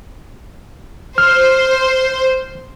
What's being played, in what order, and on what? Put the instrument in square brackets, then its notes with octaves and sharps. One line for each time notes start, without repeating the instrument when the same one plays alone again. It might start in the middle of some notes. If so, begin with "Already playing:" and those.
[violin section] C5 [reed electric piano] F6